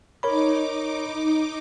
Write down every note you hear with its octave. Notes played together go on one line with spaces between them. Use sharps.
D#4 A#4 C#5 B5 D6